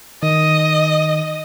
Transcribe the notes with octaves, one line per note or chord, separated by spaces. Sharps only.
D#3 D#5